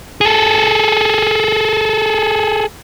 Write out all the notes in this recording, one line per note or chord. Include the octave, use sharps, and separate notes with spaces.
G#4 A4